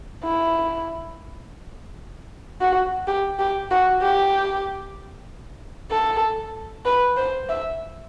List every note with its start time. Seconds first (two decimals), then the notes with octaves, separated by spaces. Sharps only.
0.24 E4
2.61 F#4
3.07 G4
3.39 G4
3.71 F#4
4.02 G4
5.91 A4
6.85 B4
7.17 C5
7.49 E5